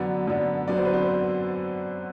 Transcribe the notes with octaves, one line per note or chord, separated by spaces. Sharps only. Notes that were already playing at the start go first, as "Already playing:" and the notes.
Already playing: F#2 D3 F#3 B3 D4 D5
F#2 D3 F#3 B3 D4
F#2 D3 F#3 B3 D4 D5
C5
B4
C4 C5